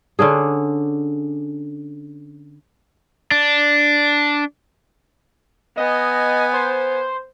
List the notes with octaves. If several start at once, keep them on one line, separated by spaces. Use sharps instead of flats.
D3 C#4 D4 G#4
D4
B3 D#5 G#5
C5